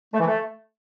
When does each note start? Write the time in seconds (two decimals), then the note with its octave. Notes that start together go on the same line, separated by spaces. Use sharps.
0.13 A3
0.20 E3
0.27 A3